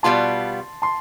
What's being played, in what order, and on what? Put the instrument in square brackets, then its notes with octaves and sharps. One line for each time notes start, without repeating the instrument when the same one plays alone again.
[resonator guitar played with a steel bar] B2 G3 B3 F4 [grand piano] A5 C6
[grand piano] A5 C6